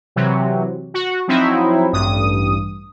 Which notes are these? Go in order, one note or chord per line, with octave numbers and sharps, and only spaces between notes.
C3 E3 F#3
F#4
F3 F#3 C4 D#4 E4
A1 G2 D#6